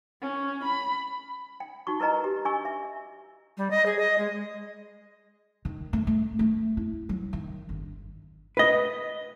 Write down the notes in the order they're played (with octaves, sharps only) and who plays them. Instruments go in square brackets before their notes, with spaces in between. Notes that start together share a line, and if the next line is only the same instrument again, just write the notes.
[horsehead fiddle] C#4
B5
[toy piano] G5
D#4 F#4 C#6
E4 A#4 B4 D#5 A#5
G4
D4 G#5 C#6 E6
E5
[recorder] G3
D#5
G#4
D#5
G#3
[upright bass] D#3
A3
A3
A3
E4
F#3
D#3
G1
[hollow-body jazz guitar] B4 D#5